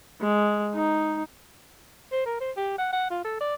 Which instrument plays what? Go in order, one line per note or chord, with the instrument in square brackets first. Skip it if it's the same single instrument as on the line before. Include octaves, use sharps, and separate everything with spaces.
[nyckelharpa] G#3
D#4
[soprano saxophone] C5
A#4
C5
G4
F#5
F#5
F4
A4
D5